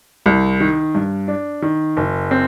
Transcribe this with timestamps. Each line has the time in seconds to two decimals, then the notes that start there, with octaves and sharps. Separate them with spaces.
0.26 C2
0.60 D#3
0.95 G2
1.28 D4
1.62 D#3
1.97 F#1
2.31 C4